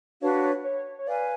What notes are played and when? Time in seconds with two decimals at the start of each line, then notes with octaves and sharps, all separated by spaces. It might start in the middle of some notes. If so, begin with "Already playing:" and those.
0.21 D4 F#4 B4 C#5 F5
0.64 C#5
0.99 C#5
1.07 B4 D5 F5 G#5